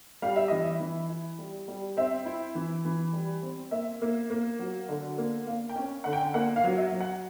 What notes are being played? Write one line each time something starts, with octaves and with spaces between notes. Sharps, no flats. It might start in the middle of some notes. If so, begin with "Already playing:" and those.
G3 F5
E5
E3 D#5
E5
E3
E4
G3
G3
C4 E5
E4
E3
E3
G3
C4
A#3 E5
A#3
A#3
F#3
D3
A#3
A#3 F5
G5
C#4
D3 F#5
G5
A#3 F#5
F5
F#3
E5
F#3
F#5